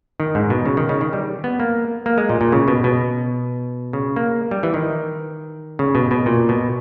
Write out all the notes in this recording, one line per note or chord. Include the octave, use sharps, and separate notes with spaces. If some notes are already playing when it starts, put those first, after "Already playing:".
D#3
G#2
B2
C#3
D#3
C#3
D#3
G3
B3
A#3
A#3
G#3
A#2
A#2
C#3
B2
B2
C#3
A#3
G3
E3
D#3
C#3
B2
B2
A#2
B2